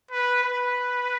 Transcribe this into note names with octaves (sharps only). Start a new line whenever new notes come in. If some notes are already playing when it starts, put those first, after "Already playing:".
B4
B4